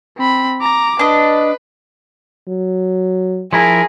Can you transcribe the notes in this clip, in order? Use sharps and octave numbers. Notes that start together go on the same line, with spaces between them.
C4 B5
A#5 D6
D4 B4 D#5
F#3
F3 E4 G#4 A#4